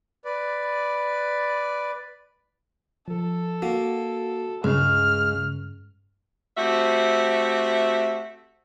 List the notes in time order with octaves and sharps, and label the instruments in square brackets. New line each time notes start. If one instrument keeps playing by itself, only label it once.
[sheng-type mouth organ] B4 D5
[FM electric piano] F3 [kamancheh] A4
[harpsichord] A#3 [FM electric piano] F#4
[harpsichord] C#2 [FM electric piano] G2 [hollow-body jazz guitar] C#3 G#3 [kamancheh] F6
[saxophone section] A3 C4 F#4 G4 C5 E5